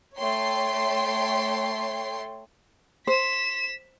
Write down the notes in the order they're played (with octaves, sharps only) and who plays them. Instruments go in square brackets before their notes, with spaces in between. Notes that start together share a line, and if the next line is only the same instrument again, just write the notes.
[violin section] A3 C#5 G5 C6 C7
[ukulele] C5 [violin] B6 E7